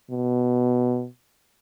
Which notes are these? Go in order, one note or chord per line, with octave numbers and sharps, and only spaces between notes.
B2